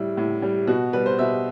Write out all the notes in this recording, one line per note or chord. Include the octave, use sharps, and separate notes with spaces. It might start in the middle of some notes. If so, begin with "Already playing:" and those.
Already playing: A2 G3 E4
A2
G3
B2 F#4
G3 B4
C5
B2 E5